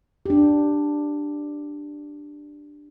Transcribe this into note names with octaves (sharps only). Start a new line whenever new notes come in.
D4 G4